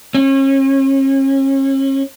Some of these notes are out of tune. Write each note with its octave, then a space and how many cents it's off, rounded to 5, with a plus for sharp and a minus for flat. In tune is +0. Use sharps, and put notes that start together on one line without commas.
C#4 -40